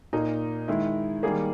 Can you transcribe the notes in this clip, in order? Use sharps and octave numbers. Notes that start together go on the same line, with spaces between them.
A#2 A#3 D#4
D#3 G#3 E4
D#3 G3 A#3 G#4